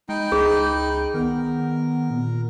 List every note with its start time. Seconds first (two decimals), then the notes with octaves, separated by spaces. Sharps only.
0.09 G#3 D#4 G5 B5
0.32 C#2 G#4
1.14 D#3 B3 A#4
2.10 A#2